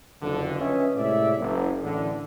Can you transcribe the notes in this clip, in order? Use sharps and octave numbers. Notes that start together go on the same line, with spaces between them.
F#1 F2 D3
C#4 F4 B4 D#5 E5
A2 C3 G#3 C#5 D5 E5
F#1
A1 D3